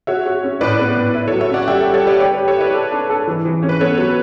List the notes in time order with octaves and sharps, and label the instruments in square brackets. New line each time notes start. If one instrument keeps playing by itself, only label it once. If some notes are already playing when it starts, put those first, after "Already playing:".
[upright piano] F#4 [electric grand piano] C#5 E5
[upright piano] F#4
C#4
[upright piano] A2 [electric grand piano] B4 D5
[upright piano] B3
A2
[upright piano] E4 [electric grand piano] B4
[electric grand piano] A4 C#5
[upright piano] F#3
[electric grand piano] C#5 E5
[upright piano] C#4 [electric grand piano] D5 F#5
[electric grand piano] F#5
[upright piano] G3 [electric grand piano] E5 G5
[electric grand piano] A4
[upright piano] G3
[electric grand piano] A4 C#5
[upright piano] G3 [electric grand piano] B4 D5
[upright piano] G4 [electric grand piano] A4 C#5
[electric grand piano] B4
[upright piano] G4
[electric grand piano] A4 C#5
[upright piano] E4 [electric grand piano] B4 D5
[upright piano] A4
D4
A4
E3
E3
C#4
[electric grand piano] B4
[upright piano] B3 [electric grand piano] A4 C#5
[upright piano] F#3 [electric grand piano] B4